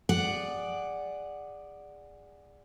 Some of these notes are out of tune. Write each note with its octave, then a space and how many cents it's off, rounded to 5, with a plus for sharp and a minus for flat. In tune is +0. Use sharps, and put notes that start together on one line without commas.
G#4 -20 D5 +0 F#5 +0